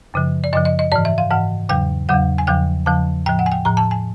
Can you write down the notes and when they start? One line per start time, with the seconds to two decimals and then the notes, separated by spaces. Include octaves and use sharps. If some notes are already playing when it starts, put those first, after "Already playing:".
0.14 F#2 C#3 F3
0.44 D5
0.53 F#2 C#3 F3 D#5
0.65 D#5
0.79 D#5
0.92 G#2 E3 D5
1.05 E5
1.18 F5
1.30 G#2 E3 F#5
1.69 E2 C#3 F#3 G5
2.09 E2 C#3 F#3 F#5
2.38 G#5
2.47 E2 C#3 F3 G5
2.86 E2 C#3 F3 A5
3.26 A2 F3 G5
3.39 F#5
3.46 G#5
3.52 G5
3.65 A2 F3 A#5
3.77 A5
3.91 G#5